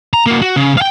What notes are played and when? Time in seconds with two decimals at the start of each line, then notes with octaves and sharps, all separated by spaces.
0.13 A#5
0.26 A#3 F#4
0.42 F#4
0.56 C#3
0.77 F5 G5